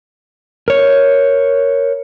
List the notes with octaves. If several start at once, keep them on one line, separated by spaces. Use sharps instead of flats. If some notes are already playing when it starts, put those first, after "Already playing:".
A#4 C#5